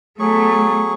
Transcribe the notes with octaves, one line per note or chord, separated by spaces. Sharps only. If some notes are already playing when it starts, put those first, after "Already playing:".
F#3 A3 B3 G#4 C#6